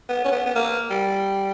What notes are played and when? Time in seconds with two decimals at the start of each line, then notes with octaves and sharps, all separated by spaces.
0.09 B3
0.24 C#4
0.32 B3
0.46 B3
0.55 A#3
0.90 G3